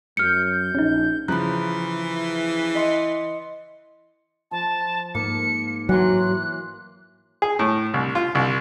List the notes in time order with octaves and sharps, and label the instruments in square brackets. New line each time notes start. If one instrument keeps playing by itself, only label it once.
[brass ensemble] F#2 [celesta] F6 C#7 [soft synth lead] G6
[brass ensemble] A#1 [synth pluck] C#4 D#4
[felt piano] C#3 F3 F#6 [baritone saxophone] E3 [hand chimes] A#5 B5
[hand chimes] D#5 C6 C#7
[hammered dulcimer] F3 [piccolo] A5
[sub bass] G#2 [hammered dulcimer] A#3 [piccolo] C#7
[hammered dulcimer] E3 C6 [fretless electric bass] F#3 [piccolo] F#6
[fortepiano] G#4
A2
C2
F4
C2